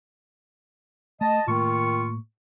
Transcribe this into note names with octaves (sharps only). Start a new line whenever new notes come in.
A3 D#5 A5
A2 D#3 A3 A#3 F4 C#6